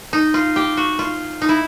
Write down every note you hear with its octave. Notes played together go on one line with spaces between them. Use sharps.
D#4
F4
G4
F#4
F4
D#4
E4